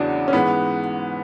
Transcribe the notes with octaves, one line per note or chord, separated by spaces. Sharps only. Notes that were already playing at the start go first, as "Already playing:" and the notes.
Already playing: E2 C#3 F#3 D4 F#4
C#4
G#2 E3 G#3 B3